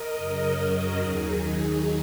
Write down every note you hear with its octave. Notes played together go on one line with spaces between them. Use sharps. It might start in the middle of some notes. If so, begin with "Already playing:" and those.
Already playing: A#4 D#5
F#2 C#3 F#3
F#4 A#4
D#2 D#3 F#3 D#4 G#4